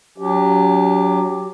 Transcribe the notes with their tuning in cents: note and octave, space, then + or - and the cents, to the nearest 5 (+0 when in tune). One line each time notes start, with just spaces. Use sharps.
F#3 +0 C#4 +45 G4 +0